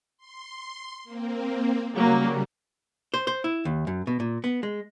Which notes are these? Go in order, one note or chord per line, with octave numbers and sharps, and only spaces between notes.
C6
A#3 C4
C#3 F#3 G3 A#3
C5
C5
E4
D#2
F#2
B2
A#2
B3
G#3